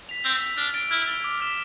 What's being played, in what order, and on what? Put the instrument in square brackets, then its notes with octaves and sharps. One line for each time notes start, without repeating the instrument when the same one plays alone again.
[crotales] B6 F7
[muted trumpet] C4 [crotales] E6
[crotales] B6 F7
[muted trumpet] D4 [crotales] F6
[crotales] A6 D7 G7
[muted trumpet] E4 [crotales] F6
[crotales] A6 D7 G7
D6
F6 B6 E7 G7